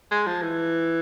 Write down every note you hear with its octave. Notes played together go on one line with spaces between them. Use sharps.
G#3
F3
E3